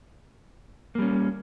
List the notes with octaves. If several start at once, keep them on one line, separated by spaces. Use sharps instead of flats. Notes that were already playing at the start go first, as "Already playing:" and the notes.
G3 A#3 C#4